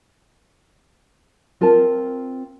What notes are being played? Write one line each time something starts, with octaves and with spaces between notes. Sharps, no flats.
C4 F4 A#4 C5 A5